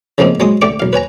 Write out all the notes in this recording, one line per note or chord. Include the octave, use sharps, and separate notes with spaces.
C#3 F3 A3 A#3 C4 D#4
F#3 G#3 C#5 C6 D#6
D3 A3 G4 D5 C#6 D6
B1 F5
B4 C#5 G#5 A#5